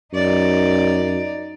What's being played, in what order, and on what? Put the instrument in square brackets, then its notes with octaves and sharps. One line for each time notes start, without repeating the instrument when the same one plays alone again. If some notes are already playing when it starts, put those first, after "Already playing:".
[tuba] F#2 [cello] D#4 D5